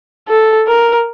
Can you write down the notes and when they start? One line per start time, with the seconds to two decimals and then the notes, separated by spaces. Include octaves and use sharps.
0.29 A4
0.68 A#4